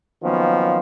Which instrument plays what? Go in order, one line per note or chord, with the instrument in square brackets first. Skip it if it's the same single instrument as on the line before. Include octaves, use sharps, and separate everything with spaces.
[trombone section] D#3 F3 F#3 A#3 B3 C#4